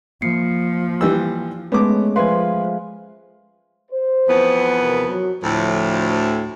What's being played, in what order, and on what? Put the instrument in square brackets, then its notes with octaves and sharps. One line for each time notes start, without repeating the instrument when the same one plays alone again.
[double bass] F3 [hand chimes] A#3 C7 C#7
[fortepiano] E3 G3 E6
[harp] G#3 A3 C#4 [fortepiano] B3 D6
[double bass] F3 [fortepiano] B4 [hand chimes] C5 E5 F5 [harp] G#5 C6
[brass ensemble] C5
[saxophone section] F2 E3 B3
[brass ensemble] D#2 C3 A#4
F#3
[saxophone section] D2 A2 [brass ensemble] F3